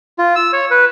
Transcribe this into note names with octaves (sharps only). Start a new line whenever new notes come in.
F4
E6
C#5
B4